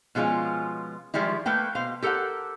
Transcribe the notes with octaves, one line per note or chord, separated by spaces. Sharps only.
B2 F3 G#3 C#4 F4
D#3 F3 G3 G#3 E4
A3 A#3 B4 G5
B2 C5 F5
G4 A4 A#4 C5 F#5